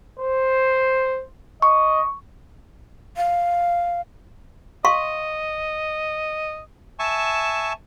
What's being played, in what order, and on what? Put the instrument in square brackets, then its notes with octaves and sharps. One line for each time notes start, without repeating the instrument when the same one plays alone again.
[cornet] C5
[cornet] D#5 [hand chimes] C#6
[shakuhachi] F5
[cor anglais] D#5 [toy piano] F5 C6 C#6
[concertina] E5 G#5 A5 C#6